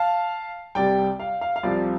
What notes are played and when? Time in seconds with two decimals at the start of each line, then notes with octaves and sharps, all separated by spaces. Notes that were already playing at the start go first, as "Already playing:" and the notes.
Already playing: F5 A5
0.75 C2 C3 G3 D5 G5
1.20 F5
1.41 F5
1.56 F5
1.63 C2 C3 F3 D5